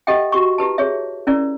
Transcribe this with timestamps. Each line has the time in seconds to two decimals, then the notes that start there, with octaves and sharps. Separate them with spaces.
0.07 G4 A4 D#5 E5 F#5 G5
0.32 F#4 G4 C#6
0.58 E4 G4 B4 A5
0.78 G#4 C#5 E5
1.27 C#4 E4 A#4 D5